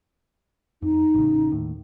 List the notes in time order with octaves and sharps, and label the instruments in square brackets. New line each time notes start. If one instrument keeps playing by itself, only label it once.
[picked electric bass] F2 [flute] D#4
[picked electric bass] A1 C#3
D#2 A2